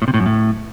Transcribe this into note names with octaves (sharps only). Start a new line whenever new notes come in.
A2
C3
A2
F#2
A2